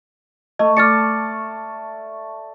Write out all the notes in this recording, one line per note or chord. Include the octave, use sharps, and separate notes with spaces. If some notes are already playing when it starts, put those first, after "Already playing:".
A3 D#5
D5 A5 F6 A6 C#7